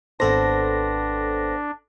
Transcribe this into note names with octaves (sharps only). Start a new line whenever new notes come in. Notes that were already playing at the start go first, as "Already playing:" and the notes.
G#1 B3 C4 D4 A4 C5 A#6